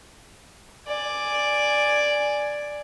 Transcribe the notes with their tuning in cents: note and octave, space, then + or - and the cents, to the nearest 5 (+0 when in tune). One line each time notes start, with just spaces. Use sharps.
D5 +0 G#5 +0